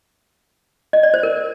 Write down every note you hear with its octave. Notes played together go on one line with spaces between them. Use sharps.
D#5
D5
C5
A#4